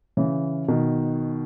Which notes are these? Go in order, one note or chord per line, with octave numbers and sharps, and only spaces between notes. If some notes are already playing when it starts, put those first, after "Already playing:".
C#3 E3
B2 D#3